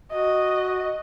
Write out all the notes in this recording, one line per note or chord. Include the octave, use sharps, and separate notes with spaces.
F#4 D#5